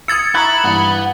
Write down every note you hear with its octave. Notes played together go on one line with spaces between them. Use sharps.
D#6 E6 G#6 A6 C#7
E4 A#5 B5 C#6 F#6
G2 E3 B3